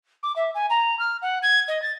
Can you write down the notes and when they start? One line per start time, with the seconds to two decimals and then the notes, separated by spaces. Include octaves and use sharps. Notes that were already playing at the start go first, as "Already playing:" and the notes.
0.23 D6
0.36 E5
0.55 G#5
0.70 A#5
0.99 F6
1.22 F#5
1.42 G#6
1.68 D#5
1.82 A6